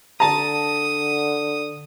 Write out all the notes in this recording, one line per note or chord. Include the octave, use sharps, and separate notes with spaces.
D3 A5 A#5 D#6